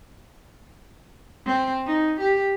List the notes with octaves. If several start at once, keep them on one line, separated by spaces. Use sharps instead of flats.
C4
D#4
G4